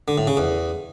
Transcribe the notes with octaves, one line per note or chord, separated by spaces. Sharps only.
D3
A2
C#3
E2